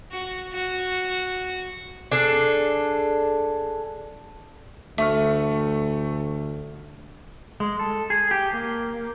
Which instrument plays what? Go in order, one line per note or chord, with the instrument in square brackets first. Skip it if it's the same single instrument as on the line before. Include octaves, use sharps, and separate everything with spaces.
[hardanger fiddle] F#4
F#4
[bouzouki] D4 G#4 A4
[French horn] D2 [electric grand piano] A3 C#6 F6 [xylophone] E5
[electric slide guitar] G#3
A4
G#4
G4
A#3